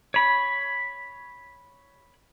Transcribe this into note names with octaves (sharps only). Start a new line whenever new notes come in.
C#5 B5